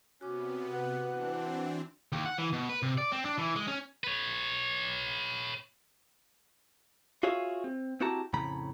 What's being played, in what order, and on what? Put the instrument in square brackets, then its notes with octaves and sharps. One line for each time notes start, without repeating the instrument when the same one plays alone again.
[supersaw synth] C3 B3 [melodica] C#4 [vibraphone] F#4 D6
[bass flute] B4 [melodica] F#5
[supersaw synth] E3 C4 D4
[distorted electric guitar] D#2
F#5
E3
B2
B4
C3
D5
C4
D4
E3
G#3
C#4
B4 C#5
[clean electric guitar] F4 F#4 G#4 C#5 E5 F5
C4
C4 E4 F#4 G4 A5 A#5
F2 A2 C#3 A#5 B5